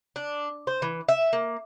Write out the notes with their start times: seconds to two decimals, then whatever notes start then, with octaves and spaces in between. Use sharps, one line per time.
0.16 D4
0.67 C5
0.82 E3
1.09 E5
1.33 A#3